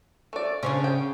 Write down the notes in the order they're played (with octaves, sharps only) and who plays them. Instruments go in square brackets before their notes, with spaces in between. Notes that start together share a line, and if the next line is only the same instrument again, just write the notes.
[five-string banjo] A3 D5
[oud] C#3 C#4 D4 [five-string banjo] C5 C#5
[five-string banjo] G5